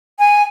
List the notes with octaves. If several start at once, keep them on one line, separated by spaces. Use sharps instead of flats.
G#5